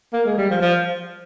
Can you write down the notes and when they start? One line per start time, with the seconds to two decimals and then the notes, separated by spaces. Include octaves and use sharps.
0.13 A#3
0.25 G#3
0.38 G3
0.50 F3
0.61 F3